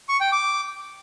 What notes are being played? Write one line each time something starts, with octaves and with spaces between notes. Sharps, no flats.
C#6
G5
D6